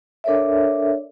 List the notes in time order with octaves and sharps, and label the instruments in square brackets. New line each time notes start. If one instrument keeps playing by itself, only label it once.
[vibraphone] D4 A4 A#4 C#5 D5 E5